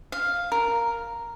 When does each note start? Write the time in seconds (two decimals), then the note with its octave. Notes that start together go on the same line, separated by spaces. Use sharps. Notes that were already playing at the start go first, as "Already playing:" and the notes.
0.12 F5
0.52 A#4